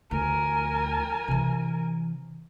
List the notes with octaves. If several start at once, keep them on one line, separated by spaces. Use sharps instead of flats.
D2 A#4 G#5
C3 E3